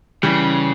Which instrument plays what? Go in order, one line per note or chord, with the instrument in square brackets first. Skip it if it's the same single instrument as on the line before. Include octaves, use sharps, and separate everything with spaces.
[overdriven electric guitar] C#3 [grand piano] E3 G3